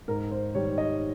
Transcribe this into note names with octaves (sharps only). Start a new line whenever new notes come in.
G#2 A#4
C5
D#3 G3 C#5
D#5